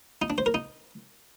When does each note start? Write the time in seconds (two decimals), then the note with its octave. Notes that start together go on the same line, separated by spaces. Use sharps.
0.22 D#4
0.30 D4
0.38 C5
0.46 A#4
0.54 D#4